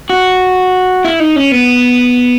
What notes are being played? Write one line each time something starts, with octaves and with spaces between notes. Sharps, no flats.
F#4
E4
D#4
C#4
B3